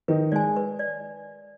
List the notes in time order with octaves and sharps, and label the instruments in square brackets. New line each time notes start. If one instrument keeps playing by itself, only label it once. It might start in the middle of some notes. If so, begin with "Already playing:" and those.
[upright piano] D#3 D#4 [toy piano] B4
[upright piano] G#3 [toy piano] D5 G#5
[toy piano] B4
D5